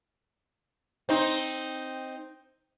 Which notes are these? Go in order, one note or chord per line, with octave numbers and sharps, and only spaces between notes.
C4 D#4